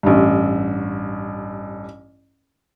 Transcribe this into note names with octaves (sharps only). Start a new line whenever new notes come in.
A1 G2